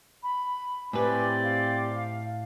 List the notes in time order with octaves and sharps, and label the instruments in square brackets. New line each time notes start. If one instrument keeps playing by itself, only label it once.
[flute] B5
[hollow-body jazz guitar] A2 B4 [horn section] C4 G4 D5 [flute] G#5
[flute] F5